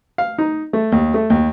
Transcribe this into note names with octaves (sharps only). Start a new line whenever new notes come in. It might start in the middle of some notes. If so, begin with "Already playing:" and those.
F5
D#4
A3
D#2
A3
D#2